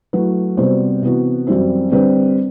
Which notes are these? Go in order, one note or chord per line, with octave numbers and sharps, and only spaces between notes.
F#3 A3 E4 B4
C3 G3 B3 F#4 C5
C3 E3 B3 F#4
F#2 E3 G3 C4 E4
D3 G3 C4 G4 B4